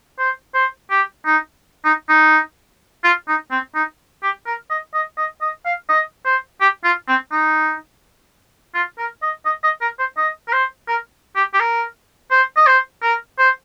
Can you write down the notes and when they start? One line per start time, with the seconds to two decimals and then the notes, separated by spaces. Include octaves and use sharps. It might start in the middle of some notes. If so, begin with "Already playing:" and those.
0.18 C5
0.54 C5
0.90 G4
1.26 D#4
1.85 D#4
2.09 D#4
3.04 F4
3.28 D#4
3.51 C4
3.75 D#4
4.23 G4
4.46 A#4
4.70 D#5
4.94 D#5
5.17 D#5
5.41 D#5
5.65 F5
5.89 D#5
6.25 C5
6.61 G4
6.84 F4
7.08 C4
7.31 D#4
8.74 F4
8.98 A#4
9.22 D#5
9.45 D#5
9.63 D#5
9.81 A#4
9.99 C5
10.17 D#5
10.48 A#4
10.53 C5
10.88 A#4
11.36 G4
11.54 G4
11.60 A#4
12.31 C5
12.56 D#5
12.67 C5
13.02 A#4
13.38 C5